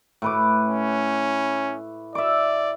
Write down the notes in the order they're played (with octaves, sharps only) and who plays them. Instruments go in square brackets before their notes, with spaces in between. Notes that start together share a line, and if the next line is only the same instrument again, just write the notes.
[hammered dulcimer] A2 B4 D6
[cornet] C#4
[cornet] D5 [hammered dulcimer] E5 D6